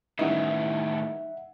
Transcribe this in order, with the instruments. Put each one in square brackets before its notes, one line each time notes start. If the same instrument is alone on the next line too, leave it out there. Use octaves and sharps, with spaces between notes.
[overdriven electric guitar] A2 D#3 [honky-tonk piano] E3 G3 C#4 [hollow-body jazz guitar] D#4 [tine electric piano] E5 F#5